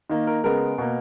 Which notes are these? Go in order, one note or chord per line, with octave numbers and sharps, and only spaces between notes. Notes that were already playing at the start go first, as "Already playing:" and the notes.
D#3 A#3
A#4
C#3 G#3 B3 A#4
B2 A#3